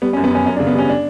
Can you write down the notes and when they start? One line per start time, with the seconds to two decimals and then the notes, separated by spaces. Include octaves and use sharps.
0.02 G3 B3
0.13 C#4
0.17 F#2
0.24 B3
0.31 F#2 C#4
0.46 F#2 C#4
0.56 D4
0.60 C#3
0.67 B3
0.75 G3 C#4
0.89 D4